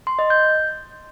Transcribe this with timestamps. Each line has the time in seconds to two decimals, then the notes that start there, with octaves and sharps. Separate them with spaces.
0.07 C6
0.19 D#5
0.30 G6